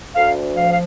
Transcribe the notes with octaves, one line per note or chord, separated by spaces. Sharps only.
D2 F5
F3 F5
F5